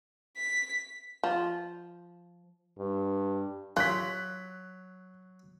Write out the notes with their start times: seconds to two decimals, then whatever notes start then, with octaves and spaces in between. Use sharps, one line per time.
0.37 B6
1.24 F3
2.79 G2
3.77 F#3 F4 F#6 B6